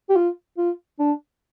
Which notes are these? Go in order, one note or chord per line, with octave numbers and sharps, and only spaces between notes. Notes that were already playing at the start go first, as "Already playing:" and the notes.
G4
F4
F4
D4